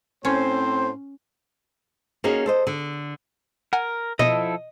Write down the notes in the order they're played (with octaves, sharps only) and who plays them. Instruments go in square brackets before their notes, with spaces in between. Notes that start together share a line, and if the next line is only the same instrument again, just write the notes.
[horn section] A2 C4 C5 [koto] C#4
[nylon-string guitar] A#3 C#4 D#4 F#4 G#4
A4 C5 D#5
D3
[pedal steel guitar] A#4 [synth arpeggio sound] F#5 G#5
[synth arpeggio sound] B2 [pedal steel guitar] F3 E4 A4 [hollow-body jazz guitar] D#5